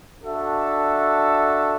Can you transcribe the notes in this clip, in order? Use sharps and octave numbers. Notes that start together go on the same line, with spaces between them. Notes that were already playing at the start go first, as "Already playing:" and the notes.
D4 F#4 A4 E5